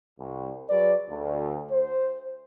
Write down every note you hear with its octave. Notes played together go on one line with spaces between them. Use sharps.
C2
F#3 G#4 B4 D5
D2
C5